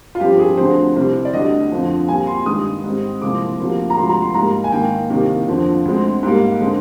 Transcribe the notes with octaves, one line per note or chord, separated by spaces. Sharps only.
F4
G2 F3 C4 G4
G#4
D2 D3 F3 C4 C5
C2 C3 G3 C4
D5
D2 D3 G3 D#5
F2 D3 F3 C4
A#2 G3 C4 G#5
C6
G2 D#3 G#3 D#6
G#2 G3 C4
C2 A#2 F3 G#3 C4 D6
D2 C3 F3 A#3
A#5
D2 C3 F3 G#3 C6
A#5
C6
G#2 G3 A#3 A#5
G#5
G#2 D#3 A#3 G5
C2 C3 D#3 A#3
F2 D3 F3 C4
D2 D3 G#3 C4
G#2 G3 A#3
D3 G#3 C4